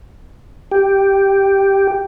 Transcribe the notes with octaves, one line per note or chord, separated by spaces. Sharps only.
G4